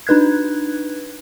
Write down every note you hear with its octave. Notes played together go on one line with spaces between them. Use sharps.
D4 D#4 B4 F#6 G#6